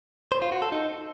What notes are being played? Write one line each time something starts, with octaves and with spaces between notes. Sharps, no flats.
C5
F4
F#4
A4
D#4